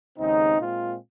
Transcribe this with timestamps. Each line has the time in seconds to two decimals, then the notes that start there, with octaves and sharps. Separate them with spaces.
0.18 D#2 C#3 G#3 C4 D#4
0.58 A#2 G#3 C4 F4